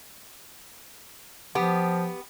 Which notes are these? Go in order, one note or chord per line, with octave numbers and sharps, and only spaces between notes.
F3 B3 G4